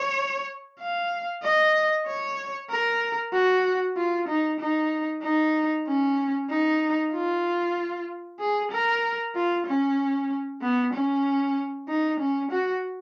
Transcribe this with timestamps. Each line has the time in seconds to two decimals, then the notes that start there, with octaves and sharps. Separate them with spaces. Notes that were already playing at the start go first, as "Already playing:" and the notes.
Already playing: C#5
0.80 F5
1.43 D#5
2.07 C#5
2.70 A#4
3.33 F#4
3.97 F4
4.28 D#4
4.60 D#4
5.23 D#4
5.87 C#4
6.50 D#4
7.13 F4
8.40 G#4
8.71 A#4
9.35 F4
9.67 C#4
10.62 B3
10.94 C#4
11.89 D#4
12.20 C#4
12.51 F#4